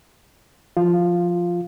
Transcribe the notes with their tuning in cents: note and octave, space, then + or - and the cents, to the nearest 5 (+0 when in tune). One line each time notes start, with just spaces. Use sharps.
F3 +0 F4 +0